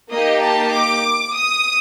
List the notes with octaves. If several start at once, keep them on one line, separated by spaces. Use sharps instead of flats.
A#3 D#4 G4 D#5
A5
D6
D#6